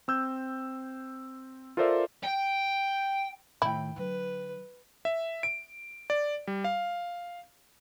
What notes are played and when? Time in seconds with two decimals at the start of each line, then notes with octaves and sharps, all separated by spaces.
0.08 C4 E6 G6
1.77 F4 A4 A#4 C5 D5 E5
2.23 G5
3.62 A2 D#3 E4 G5 B5
3.96 D3 F#3 B4
5.05 E5
5.43 D7
6.10 D5
6.47 G3
6.64 F5